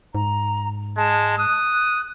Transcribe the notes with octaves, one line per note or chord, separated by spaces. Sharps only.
G#2 A#5
G#3 A5
D#6 F#6